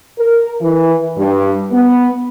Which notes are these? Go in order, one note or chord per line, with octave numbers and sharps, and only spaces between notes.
A#4
E3
G2
B3